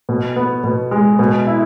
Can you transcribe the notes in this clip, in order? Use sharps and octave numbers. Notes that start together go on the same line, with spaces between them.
B2
B3
B2
G#3
B2
E4